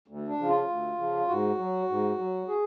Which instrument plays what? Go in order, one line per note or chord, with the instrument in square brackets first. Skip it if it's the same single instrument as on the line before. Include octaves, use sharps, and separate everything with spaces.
[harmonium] D2
D4
C#3 F3
F4
D2
C#3 F3
G#2 F#4
F#3
G#2
F#3
G#4